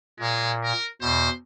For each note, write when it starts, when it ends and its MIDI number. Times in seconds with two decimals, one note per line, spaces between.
0.20 0.73 46
0.20 0.51 56
0.63 0.88 70
1.01 1.29 40
1.01 1.29 47
1.01 1.30 72